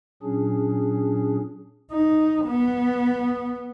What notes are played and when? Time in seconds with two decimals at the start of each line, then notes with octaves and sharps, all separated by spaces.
0.23 A#2 F#3 C#4 D4 G#4
1.92 D#4
2.45 B3